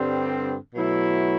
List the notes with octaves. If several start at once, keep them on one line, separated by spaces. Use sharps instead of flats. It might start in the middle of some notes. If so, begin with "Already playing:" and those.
Already playing: G2 D3 G3 C4
B2 F#3 A3 E4